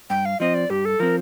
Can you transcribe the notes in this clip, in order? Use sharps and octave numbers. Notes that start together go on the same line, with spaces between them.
G2 G5
F5
F3 C4 D#5
D5
G2 G4
A4
F3 C4 A#4